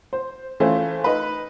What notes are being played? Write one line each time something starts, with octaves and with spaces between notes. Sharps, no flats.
C5
E3 A3 C#4 F4 C5
D#4 B4